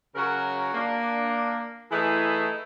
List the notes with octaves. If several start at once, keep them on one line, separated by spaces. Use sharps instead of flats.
C#3 F#3 F#4 A#4
A#3 D4
E3 A3 D#4 E4 G#4